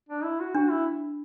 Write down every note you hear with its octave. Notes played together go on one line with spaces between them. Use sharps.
D4
E4
F#4
D4 F#4
E4